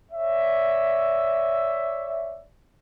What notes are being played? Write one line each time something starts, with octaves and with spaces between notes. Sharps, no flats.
C#5 D5 E5